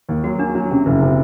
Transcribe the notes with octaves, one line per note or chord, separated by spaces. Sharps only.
D#2
F#3 F#4
A#3 D4
F#3 D4
C3 C#4
F#1
C3